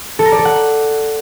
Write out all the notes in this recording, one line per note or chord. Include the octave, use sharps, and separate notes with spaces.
A4
A#5
D5
A4
F#5